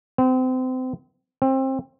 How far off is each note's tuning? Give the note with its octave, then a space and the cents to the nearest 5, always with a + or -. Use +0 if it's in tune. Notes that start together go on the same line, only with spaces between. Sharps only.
C4 -30
C4 +25